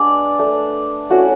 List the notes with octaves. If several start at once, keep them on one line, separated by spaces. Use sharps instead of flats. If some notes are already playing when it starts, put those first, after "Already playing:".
Already playing: G#3 B3 D4 D5
A3 D4
A3 C#4 E4 F#4